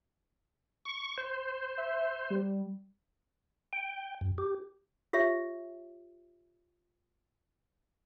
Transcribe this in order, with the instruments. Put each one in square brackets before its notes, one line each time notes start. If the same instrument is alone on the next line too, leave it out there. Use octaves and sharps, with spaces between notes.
[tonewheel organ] C#6
C5
[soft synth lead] E5
G3
[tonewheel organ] G5
F#2
G4
[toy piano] F4 G4 C#5 E5